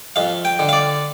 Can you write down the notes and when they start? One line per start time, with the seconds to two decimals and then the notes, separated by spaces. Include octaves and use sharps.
0.16 F2 F5
0.45 G5
0.59 D3
0.69 F5
0.73 D5